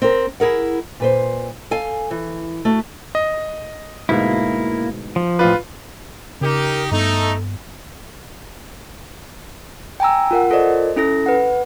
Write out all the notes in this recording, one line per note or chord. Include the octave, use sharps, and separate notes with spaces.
C4 A#4
E4 G#4 A#4 F#5
A#2 B4 C5
A4 F5 G#5
E3
A3 F#4
D#5
D2 G#2 B2 A#3 E4
F3
A1 F4 B4 D5
C#3 D#4 G4 A#4
G2 A3 B3 D#4 A4
G5 G#5 A#5 E6
F4 A#4 F#5
F4 A4 A#4 C5 D5 D#5
C#4 E4 A4 A#6
B4 F#5